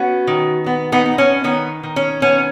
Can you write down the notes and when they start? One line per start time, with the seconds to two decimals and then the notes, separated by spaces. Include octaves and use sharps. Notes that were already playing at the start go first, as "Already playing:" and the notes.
Already playing: B3 C#4 F#4
0.27 D#3
0.66 B3
0.92 B3 D#4
1.06 B3
1.18 C#4
1.44 D#3 B3
1.83 D#3
1.96 C#4
2.22 B3 C#4